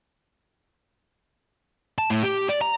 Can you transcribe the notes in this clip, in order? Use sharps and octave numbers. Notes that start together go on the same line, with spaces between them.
A5
A2
G4
D5
A#5